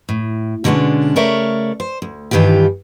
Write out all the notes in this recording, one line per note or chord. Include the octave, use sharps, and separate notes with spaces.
A2
B2 D3 G3 G#3 C#4 D4
C#3 A3 A#4 C#5 D5 E5
C5
D2
G2 D#3 E3 F4 G4